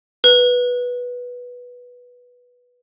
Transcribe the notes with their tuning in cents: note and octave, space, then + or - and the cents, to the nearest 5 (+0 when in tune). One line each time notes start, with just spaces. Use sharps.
B4 -10